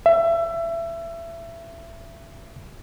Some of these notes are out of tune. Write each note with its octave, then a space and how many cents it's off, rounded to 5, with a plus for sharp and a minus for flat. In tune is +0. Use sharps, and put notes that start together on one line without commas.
E5 +25